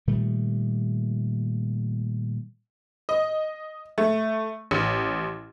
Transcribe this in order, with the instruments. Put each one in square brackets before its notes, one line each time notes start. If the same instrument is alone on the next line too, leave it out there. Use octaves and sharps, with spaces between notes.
[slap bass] A#2 D#3 G3 A3
[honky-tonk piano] D#5
A3
A1